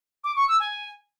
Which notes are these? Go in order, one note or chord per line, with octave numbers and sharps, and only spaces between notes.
D6
C#6
E6
G#5